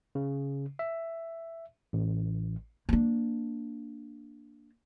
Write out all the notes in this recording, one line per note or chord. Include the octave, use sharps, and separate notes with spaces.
C#3
E5
A1
A#3 D4